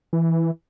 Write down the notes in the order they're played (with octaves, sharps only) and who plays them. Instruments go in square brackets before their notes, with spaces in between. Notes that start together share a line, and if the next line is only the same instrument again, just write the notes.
[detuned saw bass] E3